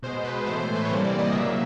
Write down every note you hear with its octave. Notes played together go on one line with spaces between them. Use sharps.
B2 G#3 C5
B4
A2 E3 A3 C5
C5
B4
C#5
C3 E3 G3 A#3 C5
D5
D#5
C#3 F#3 A#3 E5